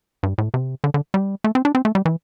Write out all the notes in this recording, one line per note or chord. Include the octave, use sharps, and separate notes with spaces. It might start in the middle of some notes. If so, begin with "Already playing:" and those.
G2
A2
C3
D3
D3
G3
A3
C4
D4
C4
A3
G3
E3